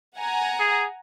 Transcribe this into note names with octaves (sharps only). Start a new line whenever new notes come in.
F#5 G#5 A#5
G#4